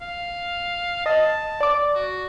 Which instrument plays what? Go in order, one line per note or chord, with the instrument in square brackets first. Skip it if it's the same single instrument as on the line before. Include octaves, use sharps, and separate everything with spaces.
[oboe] F5
[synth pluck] D#5 [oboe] A5
[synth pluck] D5 D6
[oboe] F#4